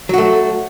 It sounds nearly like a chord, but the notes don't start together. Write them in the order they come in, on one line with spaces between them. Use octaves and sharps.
F#3 F#4 A3